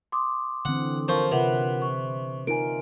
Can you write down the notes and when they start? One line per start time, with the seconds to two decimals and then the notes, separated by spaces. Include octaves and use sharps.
0.12 C6 D6 D#6
0.65 D3 E3 C4 F#5
1.08 F3 A#4 C#6 G6
1.32 C3 F4 A#4 B4 F#5
1.82 C#6
2.47 D#4 F4 A#4 G#5 D7